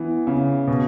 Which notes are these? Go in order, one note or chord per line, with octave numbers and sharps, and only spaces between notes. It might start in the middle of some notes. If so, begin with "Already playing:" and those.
Already playing: E3 B3
C#3
B2